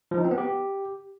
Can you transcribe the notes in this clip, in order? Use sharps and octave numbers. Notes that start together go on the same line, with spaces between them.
F3
D#4
C4
B3
G4